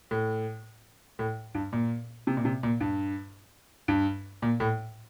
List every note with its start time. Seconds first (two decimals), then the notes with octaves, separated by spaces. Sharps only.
0.11 A2
1.19 A2
1.55 G2
1.73 A#2
2.27 C3
2.37 A#2
2.45 C3
2.63 A#2
2.81 G2
3.88 G2
4.42 A#2
4.60 A2